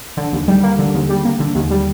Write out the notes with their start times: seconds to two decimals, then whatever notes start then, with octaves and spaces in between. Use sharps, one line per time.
0.17 D3
0.32 D#2
0.48 G3
0.63 A#3
0.79 D3
0.94 D#2
1.09 G3
1.25 A#3
1.40 D3
1.55 D#2
1.71 G3